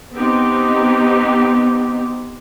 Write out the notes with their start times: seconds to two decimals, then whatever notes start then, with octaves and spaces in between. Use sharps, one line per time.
0.14 B3 C4 D#4 G4